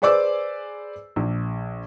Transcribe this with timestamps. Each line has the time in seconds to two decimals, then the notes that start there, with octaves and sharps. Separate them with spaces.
0.02 G#4 B4 C5 D5 D6 E6
1.16 A#1